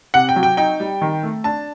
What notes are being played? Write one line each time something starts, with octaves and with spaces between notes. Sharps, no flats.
C3 F#5
G5
F#3
G5
D#4 G5
G3
D#3
A3
D4 A5